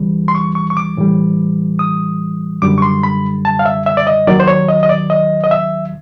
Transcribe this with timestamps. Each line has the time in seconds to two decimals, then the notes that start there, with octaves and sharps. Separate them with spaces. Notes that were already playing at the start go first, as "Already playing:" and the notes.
Already playing: D2 C#3 E3 G3
0.28 C6
0.35 C#6
0.55 C#6
0.70 C#6
0.77 D6
0.97 A2 E3 G3
1.79 D#6
2.62 F#2 D3 G3 D6
2.78 C#6
2.82 C6
3.03 B5
3.45 A5
3.59 F5
3.65 E5
3.86 E5
3.97 D5
4.07 D#5
4.27 D#2 D#3 F#3 D5
4.40 C5
4.48 C#5
4.68 D#5
4.83 D#5
4.89 D5
5.10 D#5
5.44 D#5
5.51 E5